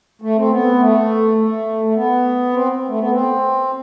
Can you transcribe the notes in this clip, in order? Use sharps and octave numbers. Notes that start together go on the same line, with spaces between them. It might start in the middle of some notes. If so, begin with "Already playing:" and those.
A3
C4
B3
A3
A3
A3
B3
C4
A3
B3
C4